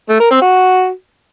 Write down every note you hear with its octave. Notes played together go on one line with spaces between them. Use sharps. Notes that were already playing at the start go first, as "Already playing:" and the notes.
A3
A#4
C4
F#4